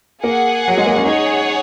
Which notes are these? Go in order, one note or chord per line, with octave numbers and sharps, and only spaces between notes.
A#3 G#4 F#5
F#3
G#3
A#3
C#4
D#4 G#4 C#5 F#5